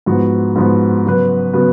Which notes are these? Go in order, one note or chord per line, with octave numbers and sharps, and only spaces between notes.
G#2 F3 B3 F#4
G#2 F3 B3 F#4
C#3 F#3 B3 F#4 B4
C#3 F#3 B3 F#4 B4